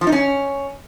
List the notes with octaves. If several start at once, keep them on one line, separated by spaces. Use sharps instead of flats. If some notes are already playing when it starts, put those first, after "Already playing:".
F3
D#4
C#4